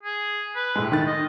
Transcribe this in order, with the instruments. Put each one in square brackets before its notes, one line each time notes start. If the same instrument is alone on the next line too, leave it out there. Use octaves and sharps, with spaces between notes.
[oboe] G#4
B4
[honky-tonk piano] A2 G#3
D#3 A6
[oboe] D#5